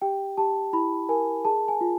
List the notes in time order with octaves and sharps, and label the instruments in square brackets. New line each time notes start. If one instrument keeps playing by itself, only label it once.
[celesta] G4 G5
G4 A5
E4 B5
A#4 G#5
G#4 A5
G#5
F4